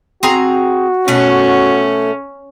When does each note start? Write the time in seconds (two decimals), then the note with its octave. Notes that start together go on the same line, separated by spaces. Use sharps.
0.23 C4 F#4 G#4 A#5
1.08 B2 A3 C#4 F#5